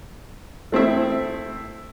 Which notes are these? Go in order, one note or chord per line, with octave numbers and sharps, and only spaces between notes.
A3 C4 E4 E5